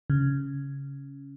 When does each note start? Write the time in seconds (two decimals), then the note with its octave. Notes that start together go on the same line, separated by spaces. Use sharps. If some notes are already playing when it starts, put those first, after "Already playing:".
0.10 C#3